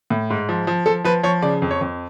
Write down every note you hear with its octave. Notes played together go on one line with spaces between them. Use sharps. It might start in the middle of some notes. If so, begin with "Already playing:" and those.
A2
G#2
F3
F3
F3 A4
F3 B4
F3 C#5
C#3 D5
F2
C#5
F2